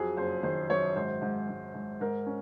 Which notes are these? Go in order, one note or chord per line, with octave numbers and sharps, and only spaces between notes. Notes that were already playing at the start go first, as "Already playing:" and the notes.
Already playing: F2 F#3 G#4
F#1 C5
D#3 C5
F#2 C#5
G#2 C5
G#2
G#2
G#2
G#2 A#4
C#4